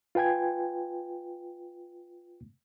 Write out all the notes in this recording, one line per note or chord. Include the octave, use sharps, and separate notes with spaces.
F4 B4 G5 G#5 G#6